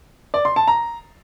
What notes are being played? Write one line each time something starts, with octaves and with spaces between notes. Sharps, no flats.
D5
C6
A5
A#5